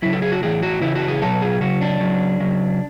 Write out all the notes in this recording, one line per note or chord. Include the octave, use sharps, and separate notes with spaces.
C#3 F#3 E4
A4
G#4
F#4
A2 E3 G#4
F#4
C#3 E3 E4
F#4
G#4
B2 F#3 A4
G#4
C#3 F#3 F#4
D4
C#3 F#3
C#3 F#3